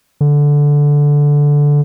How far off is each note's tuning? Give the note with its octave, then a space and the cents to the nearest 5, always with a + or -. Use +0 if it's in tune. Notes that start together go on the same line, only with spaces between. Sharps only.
D3 -10